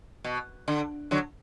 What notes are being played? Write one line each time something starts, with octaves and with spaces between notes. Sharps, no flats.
B2
D3
D3 F#3